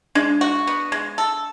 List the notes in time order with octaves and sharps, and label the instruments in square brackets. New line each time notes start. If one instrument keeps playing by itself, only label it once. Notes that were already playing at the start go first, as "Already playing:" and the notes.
[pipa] G#3 [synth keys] D4
[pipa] F#4
B3
G#3
A4